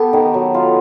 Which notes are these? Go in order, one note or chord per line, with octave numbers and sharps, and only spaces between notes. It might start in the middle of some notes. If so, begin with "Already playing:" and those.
Already playing: B3 G4 A4
D#3
F#3
F4